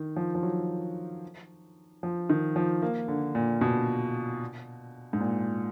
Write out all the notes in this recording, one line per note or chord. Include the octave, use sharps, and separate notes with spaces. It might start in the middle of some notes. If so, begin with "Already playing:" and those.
Already playing: D#3
F3
F3
F#3
F3
D#3
F3
A#3
D3
A#2
B2
G#2
A#2